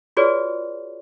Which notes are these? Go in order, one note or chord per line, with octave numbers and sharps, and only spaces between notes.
F4 F#4 G#4 B4 C#5 D5